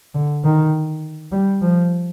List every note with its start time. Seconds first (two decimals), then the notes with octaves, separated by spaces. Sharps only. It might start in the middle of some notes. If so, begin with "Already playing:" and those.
0.14 D3
0.44 D#3
1.32 G3
1.62 F3